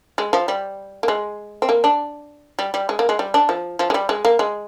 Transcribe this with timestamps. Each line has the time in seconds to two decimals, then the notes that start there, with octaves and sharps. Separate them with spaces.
0.18 G#3
0.33 F3
0.48 G3
1.03 A#3
1.08 G#3
1.62 C4
1.69 A#3
1.84 D4
2.59 G3
2.74 G3
2.89 G#3
2.99 A#3
3.09 G#3
3.19 G3
3.34 D4
3.49 F3
3.79 F3
3.90 G#3
3.94 G3
4.09 G#3
4.25 A#3
4.39 G#3